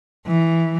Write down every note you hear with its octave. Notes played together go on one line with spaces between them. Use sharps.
E3